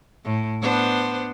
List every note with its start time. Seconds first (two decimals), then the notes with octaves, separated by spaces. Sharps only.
0.24 A2
0.61 B3 D4 C5